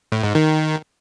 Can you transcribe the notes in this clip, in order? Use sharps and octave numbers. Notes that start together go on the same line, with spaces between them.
A2
G#2
D#3